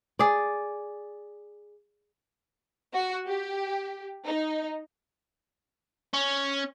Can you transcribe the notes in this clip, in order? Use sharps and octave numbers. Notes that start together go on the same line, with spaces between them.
G#4 D5
F#4
G4
D#4
C#4